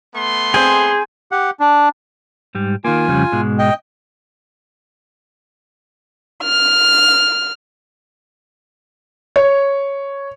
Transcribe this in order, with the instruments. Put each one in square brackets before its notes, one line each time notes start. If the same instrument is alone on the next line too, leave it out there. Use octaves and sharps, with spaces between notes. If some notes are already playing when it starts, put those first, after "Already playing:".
[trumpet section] A3 B3 C6
[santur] C4 G5 [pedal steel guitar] G#4
[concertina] G4 F#5
D4
[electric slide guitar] G#2 G3
[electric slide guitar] D#3 A#3 [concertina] F4 G#5
[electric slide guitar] F2 C#3 G3
G#2 B2 G#3
[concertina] D#5 G5
[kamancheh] F6
[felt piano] C#5